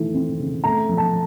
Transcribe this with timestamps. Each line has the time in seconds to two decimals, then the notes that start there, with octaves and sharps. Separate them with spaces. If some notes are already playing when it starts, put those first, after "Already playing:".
Already playing: D#3 E3 A3
0.14 C4
0.39 C#3
0.64 A3 A#5
0.89 F3
0.97 A5